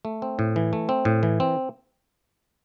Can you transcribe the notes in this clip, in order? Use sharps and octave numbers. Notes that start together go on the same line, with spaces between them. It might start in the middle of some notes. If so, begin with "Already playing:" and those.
A3
C4
A2
E3
A3
C4
A2
E3
C4